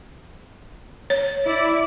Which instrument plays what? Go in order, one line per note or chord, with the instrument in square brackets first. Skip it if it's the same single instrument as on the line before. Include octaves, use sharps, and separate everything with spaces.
[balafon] C#5
[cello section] E4 D5